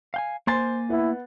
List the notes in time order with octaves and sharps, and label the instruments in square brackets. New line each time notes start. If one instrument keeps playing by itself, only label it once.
[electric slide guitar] F5 G5 G#5
[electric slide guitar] A#3 G#5 [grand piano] C5 C6 A6
[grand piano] B3 [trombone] E4